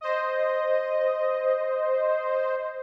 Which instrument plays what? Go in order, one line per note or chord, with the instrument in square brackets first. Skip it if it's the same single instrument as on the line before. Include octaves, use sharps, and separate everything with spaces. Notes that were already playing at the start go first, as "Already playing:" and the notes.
[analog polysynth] C5 D#5